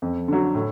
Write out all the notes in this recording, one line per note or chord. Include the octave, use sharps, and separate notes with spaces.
F2
D3 F#3
A2